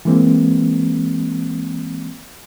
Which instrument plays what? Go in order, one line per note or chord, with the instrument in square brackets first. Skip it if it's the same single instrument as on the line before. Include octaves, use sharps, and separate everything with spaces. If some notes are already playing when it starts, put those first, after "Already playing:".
[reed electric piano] E3 G#3 A#3 C4